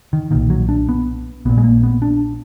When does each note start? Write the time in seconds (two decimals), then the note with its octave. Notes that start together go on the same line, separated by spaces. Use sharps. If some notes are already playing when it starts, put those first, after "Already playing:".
0.13 D#3
0.31 B1 A#2 D#3
0.50 F#3
0.69 D4
0.89 B3
1.45 A#1 A#2 B3
1.57 G#3
1.64 A#3
1.83 B3
2.02 D4